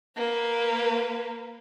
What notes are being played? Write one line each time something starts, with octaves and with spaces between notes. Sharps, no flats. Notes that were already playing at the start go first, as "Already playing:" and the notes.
A#3 B4